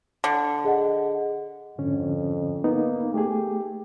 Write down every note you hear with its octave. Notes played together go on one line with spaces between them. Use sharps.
D3
G#4 D#5 F#5
F2 G#2 D3 C#4
A#3 B3 D#4
A3 G4 G#4